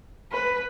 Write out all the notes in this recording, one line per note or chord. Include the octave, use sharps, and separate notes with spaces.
B4